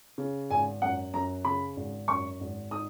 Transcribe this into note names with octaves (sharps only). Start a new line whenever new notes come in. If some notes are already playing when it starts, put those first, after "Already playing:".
C#3
G#1 G#5
F#2 F#5
F#2 A#5
C#3 B5
G#1
F#2 C#6
G#1
D#4 D#6